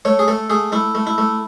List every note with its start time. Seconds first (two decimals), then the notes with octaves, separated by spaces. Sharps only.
0.05 A3 C#5
0.19 G#4
0.28 A3 A4
0.50 A3 G#4
0.72 A3 E4
0.95 A3
1.07 E4
1.18 A3